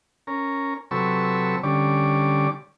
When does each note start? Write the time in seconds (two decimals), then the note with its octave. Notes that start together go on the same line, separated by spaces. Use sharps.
0.27 C#4 A#4
0.91 C3 F#3 A4 B4 C#6 E6
1.63 D3 G3 C#4 D6